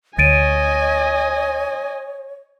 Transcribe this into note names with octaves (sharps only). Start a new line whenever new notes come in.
D2 C#5 D#5 G#5 A6 D7 D#7